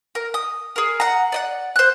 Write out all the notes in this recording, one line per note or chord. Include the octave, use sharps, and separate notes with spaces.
A#4
D#6
G#4 A#4
F#5 A#5
D5 D#5 F#5
C5 F#6